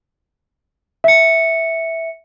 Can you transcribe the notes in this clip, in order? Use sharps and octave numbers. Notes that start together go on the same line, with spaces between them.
E5 C#7